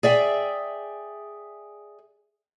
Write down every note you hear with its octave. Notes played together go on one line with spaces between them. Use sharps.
G#4 D5 E5 G5